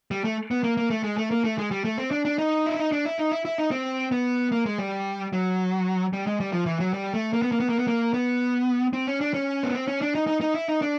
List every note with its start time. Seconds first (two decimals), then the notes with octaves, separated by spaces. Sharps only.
0.11 G3
0.24 A3
0.51 B3
0.64 A#3
0.77 A#3
0.90 A3
1.04 G#3
1.18 A3
1.31 A#3
1.45 A3
1.58 G#3
1.71 G3
1.85 A3
1.98 C4
2.11 D4
2.25 D4
2.38 D#4
2.66 E4
2.80 D#4
2.92 D4
3.05 E4
3.19 D#4
3.32 E4
3.45 E4
3.58 D#4
3.71 C4
4.12 B3
4.52 A#3
4.66 G#3
4.78 G3
5.33 F#3
6.13 G3
6.27 G#3
6.40 G3
6.52 F3
6.66 E3
6.80 F#3
6.93 G3
7.14 A3
7.33 A#3
7.42 B3
7.52 A#3
7.60 B3
7.69 A#3
7.79 B3
7.87 A#3
8.14 B3
8.93 C4
9.07 C#4
9.21 D4
9.34 C#4
9.63 B3
9.74 C4
9.88 C#4
10.01 D4
10.15 D#4
10.27 D#4
10.41 D#4
10.54 E4
10.68 D#4
10.82 D4